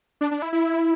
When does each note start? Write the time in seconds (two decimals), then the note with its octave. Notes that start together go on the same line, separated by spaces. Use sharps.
0.21 D4
0.31 D4
0.42 E4
0.53 E4